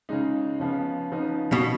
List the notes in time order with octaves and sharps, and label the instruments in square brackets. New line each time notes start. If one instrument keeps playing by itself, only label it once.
[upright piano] C#3 G#3 D#4
C#3 F3 B3
C#3 F3 B3 D#4
[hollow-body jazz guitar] B2